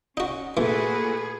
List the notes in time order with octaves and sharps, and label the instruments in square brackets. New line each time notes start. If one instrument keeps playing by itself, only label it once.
[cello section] C#4 [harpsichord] D#4 F#4
[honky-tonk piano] A#2 A3 [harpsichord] E3 [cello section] E4 F#4 B4 [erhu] G#4